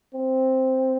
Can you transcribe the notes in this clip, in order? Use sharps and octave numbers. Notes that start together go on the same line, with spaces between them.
C4